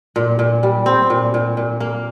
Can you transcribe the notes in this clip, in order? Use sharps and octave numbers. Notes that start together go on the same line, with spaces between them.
A#2
A#2
G3
C4
A#2
A#2
A#2
A#3